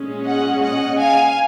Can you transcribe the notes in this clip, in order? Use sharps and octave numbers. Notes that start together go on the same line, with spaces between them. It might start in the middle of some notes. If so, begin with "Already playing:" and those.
Already playing: A#2 G#3 C#4
D#5 F#5
D#5 F#5
F5 G#5